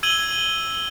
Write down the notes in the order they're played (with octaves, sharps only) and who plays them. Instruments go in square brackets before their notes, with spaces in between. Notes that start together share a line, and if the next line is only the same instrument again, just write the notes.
[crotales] E6 G#6 D#7 F#7 G7